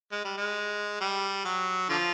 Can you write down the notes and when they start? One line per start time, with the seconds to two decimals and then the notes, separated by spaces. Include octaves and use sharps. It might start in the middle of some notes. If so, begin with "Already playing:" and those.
0.12 G#3
0.24 G3
0.37 G#3
1.01 G3
1.45 F#3
1.89 D3 F3